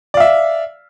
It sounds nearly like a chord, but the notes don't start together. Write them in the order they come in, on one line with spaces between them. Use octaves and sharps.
D5 F5 E5